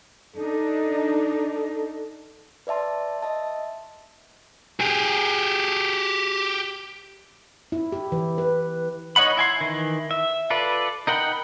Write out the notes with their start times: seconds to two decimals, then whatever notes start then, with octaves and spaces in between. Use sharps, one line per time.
0.36 D4 D#4 A4
2.67 B4 D5 E5 A5 C6
3.22 D#5 E5 A5
4.80 G4 G#4
7.72 E4
7.92 G4
8.12 E3
8.38 B4
9.16 D#4 C#5 D#5 F#5 B5
9.37 E4 G#5 C6
9.61 D#3 E3
10.11 E5
10.50 F4 A4 B4 D5
11.07 D#4 A#4 F#5 G5 B5